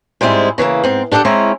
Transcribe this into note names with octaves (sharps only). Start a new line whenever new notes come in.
G#2 G3 G#3 C4 E4
C#3 E3 G3 A#3
G#2 C4
D4 G4 A4 D#5 F#5
G#3 C4 C#4 E4 A#5